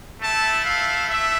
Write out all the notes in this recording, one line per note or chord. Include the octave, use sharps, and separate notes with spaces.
A3 E4 A5
F5
E5